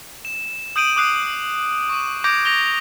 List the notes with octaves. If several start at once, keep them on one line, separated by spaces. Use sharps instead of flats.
E7
D#6 G6 D7 D#7 F#7
D6 D#6 F#6 C7 D#7
C#6 D#7
D6 G6 G#6 A#6 D7
A#6 F7 G7